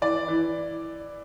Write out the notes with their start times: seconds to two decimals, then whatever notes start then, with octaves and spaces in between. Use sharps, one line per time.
0.02 E3 D5
0.28 E3